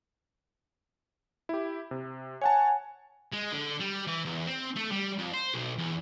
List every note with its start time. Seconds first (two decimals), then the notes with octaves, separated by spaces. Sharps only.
1.49 E4 G4
1.91 C3
2.42 C#5 F#5 G#5 A5
3.33 G#3
3.52 D3
3.80 G3
4.07 E3
4.25 E2
4.47 C4
4.76 A3
4.91 G3
5.18 F2
5.34 C5
5.54 B1
5.78 E2